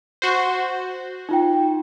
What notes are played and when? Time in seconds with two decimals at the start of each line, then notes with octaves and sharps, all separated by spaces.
0.22 F#4 C5
1.29 D#4 F4 G5